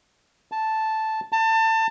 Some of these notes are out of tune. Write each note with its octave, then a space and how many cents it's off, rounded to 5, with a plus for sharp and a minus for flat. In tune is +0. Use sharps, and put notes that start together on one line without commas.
A5 -5
A5 +25